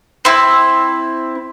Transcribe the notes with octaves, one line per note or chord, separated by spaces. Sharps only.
C4 E4